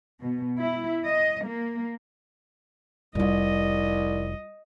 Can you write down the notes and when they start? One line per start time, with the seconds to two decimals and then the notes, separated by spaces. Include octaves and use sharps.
0.21 B2
0.58 E4
1.07 D#5
1.46 A#3
3.15 F1 C2 G3 F4 D#5